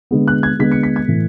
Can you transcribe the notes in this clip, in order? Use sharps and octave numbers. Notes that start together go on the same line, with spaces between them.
D3 G#3 B3
F#6
G#6
D3 G#3 B3 B6
C#7
B6
G#6
A2 E3 A3